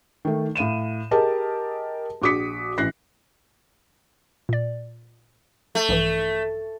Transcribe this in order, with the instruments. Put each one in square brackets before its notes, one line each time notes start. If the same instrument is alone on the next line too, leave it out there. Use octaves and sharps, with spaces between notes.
[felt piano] D#3 A3
A2 F5 D#7 E7
G4 G#4 A#4 D#5 A5
A#1 F#4 D6 D#6 B6 C#7
A1 E3 F#6 A#6 C7
[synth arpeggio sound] A#2 D5
[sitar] A3
[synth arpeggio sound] A#1 G2 E3